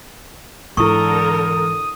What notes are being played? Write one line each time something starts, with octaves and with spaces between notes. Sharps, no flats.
G#2 D3 E3 E4 A4 A#4 C#6 D#6